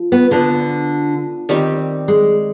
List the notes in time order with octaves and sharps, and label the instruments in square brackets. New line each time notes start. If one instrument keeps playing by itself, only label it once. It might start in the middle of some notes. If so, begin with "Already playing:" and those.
Already playing: [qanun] F3
[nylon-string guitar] B3
[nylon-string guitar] D3 [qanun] B3 D4 F4 C5
[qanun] D#3 G3 C4 G4
[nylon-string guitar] G#3